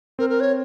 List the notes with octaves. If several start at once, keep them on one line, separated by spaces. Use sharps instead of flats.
C4 A#4
A#4
C#5